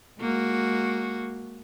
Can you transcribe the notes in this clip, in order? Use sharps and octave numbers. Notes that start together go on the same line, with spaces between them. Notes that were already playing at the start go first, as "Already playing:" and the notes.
G#3 A#3 F#4